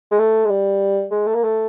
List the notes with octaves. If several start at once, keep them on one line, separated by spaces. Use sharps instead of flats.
G#3
A3
G#3
G3
G#3
A3
A#3
A3